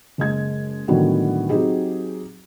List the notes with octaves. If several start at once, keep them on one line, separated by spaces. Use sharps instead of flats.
F#1 G#3 G#6
A2 D3 D#3 F#3 G3 B3
F#3 C4 D#4 G4 G#4